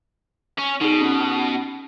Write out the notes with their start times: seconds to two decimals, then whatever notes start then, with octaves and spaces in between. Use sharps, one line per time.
0.58 C#4
0.81 B2 D#4 G#4
1.01 C#4